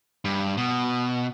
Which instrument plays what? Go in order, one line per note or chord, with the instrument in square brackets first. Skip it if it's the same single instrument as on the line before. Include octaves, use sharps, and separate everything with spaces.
[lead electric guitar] G2
B2